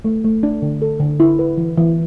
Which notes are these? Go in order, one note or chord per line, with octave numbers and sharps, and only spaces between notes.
A3
A3
D4
D3
A4
D3
E4
B4
E3
E3